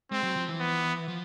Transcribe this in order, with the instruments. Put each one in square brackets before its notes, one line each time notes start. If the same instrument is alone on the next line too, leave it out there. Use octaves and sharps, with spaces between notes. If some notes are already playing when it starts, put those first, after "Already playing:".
[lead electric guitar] G#3 [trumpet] C4
[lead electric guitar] F#3
F3
E3
[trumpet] B3
[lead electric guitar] F3